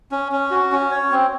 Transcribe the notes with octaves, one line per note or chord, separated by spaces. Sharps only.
C#4
C#4
F#4
C#4
C#5
C4